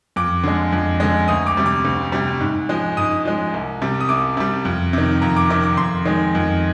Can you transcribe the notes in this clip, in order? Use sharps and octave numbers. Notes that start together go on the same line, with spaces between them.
F2 D6
D3 G#3
F2
D3 G#3
D2 D#6
D6
C3 G3
D6
D2
C3 G3
G#2
F3 G#3
G#2 D#6
F3 G#3
C2
C3 G3
D#6
C2 D6
C3 G3
F2
C3 D#3
F2 A#5
D6
C3 D#3 D6
D6
F2 C6
D#3 G#3
F2